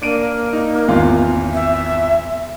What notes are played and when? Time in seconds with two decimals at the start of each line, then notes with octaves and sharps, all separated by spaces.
0.02 A#3 D4 D7 D#7
0.53 D#4
0.87 G#1 E2 F4
1.54 E5